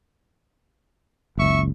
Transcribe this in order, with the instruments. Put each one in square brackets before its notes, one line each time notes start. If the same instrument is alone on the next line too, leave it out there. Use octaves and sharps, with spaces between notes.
[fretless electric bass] F#1 C#2 [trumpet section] E5 C#6